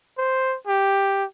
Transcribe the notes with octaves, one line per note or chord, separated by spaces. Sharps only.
C5
G4